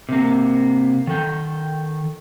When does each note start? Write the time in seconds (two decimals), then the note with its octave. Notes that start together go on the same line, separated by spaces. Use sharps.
0.09 C3 A#3
1.07 D#3 A4 G5